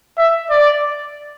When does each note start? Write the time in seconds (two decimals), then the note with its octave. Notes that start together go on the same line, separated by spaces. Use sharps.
0.18 E5
0.50 D5